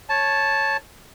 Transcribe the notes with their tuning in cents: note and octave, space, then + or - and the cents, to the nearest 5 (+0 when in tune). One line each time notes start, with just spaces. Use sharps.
C#5 -5 A5 -10